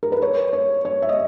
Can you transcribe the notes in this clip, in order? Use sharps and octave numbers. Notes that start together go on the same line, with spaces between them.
A#4
B4
C#5
C#5
C#5
E5
D#5